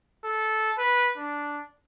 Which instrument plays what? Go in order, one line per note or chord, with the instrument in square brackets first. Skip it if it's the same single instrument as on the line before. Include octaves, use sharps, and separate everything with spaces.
[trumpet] A4
B4
D4